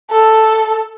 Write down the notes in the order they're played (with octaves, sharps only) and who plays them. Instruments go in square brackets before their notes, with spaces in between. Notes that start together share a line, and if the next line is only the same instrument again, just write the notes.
[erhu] A4